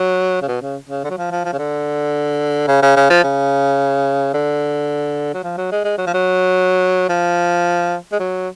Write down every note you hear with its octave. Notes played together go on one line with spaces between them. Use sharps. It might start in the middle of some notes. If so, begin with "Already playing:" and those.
Already playing: F#3
C#3
B2
C#3
C#3
D3
F#3
F3
F3
F3
C#3
D3
C#3
C#3
C#3
F3
C#3
D3
F#3
F3
F#3
G#3
G#3
F#3
F3
F#3
F3
G#3
F#3